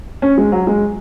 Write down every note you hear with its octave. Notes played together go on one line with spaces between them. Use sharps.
C#4
G#3
F#3
G#3